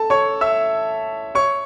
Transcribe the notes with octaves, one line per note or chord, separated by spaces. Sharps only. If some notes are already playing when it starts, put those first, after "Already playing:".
Already playing: A4 A5
C#5 C#6
E5 E6
C#5 C#6